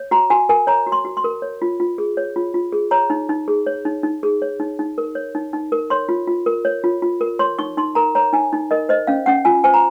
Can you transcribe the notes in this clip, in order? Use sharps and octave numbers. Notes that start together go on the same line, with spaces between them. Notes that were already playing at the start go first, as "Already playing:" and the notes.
Already playing: C#5
F#4 A#5
F#4 G#5
A#4 G#5
C#5 A#5
F#4
C6
F#4
C6
A#4
C#5
F4
F4
G#4
C#5
F4
F4
G#4
C#5 A#5
D#4
D#4
G#4
C#5
D#4
D#4
G#4
C#5
D#4
D#4
A#4
C#5
D#4
D#4
A#4
C#5 C6
F4
F4
A#4
C#5
F4
F4
A#4
C#5 C6
D#4 C#6
D#4 C6
A#4 A#5
C#5 A#5
D#4 G#5
D#4
A#4 D#5
C5 D#5
C#4 F5
C#4 F#5
F4 G#5
C5 G#5
A#5